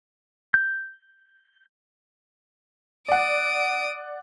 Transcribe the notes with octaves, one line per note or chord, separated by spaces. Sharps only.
G6
D5 F#5 D#6 D7